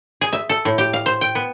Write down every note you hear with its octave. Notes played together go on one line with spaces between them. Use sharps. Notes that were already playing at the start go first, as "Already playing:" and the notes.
G#4
E5
A4
A2
G4
F5
C5
G5
B3